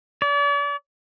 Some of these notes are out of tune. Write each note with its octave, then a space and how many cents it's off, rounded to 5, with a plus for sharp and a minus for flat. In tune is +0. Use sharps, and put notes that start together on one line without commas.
D5 -40